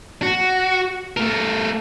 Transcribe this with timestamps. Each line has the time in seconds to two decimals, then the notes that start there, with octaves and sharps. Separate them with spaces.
0.23 F#4
1.17 A3 A#4